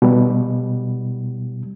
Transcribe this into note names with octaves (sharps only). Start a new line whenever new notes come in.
B2 G3